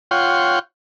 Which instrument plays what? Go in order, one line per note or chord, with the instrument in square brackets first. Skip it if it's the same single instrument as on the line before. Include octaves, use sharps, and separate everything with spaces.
[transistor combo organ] F4 C#5 F#5 G5 C6